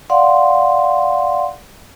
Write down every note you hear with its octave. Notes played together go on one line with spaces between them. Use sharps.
D5 F5 F#5 C6